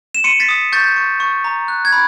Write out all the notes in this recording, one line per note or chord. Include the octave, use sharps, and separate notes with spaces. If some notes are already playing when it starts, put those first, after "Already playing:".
E7
C6 C#7 D#7
A6 B6
D#6
C#6 G6 A6
C#6
C#6
A#5
F#6
G#6
B5